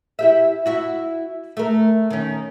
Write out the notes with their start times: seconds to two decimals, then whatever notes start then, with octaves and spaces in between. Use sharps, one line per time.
0.19 E4 G4 E5
0.66 E4 F#4
1.57 A3 A#4
2.11 D#3 C#4